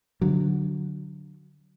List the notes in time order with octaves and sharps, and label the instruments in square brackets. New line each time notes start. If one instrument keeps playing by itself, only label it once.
[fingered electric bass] D3 F#3